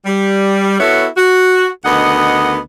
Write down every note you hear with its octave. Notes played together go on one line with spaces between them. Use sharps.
G3
B3 E4 F#4 A4 C#5
F#4
D2 D#3 B3 D#5 F#5